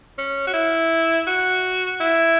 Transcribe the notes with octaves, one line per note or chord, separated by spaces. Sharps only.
C#4
F#4
E4
F#4
E4